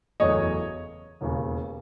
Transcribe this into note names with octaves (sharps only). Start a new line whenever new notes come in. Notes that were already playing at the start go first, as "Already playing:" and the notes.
F#1 E2 C#3 F#3 A3 C#5 D#5
E1 D#2 C#3